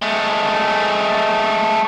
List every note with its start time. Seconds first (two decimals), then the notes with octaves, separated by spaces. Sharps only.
0.02 G#3 A3